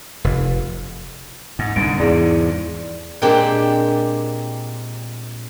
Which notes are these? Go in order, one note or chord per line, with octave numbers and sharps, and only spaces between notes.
F1
G#2
C2 G#2 D3 D7
E2 G#2 C3 E4 G#4 D5
A#2 G#3 C4 D4 G4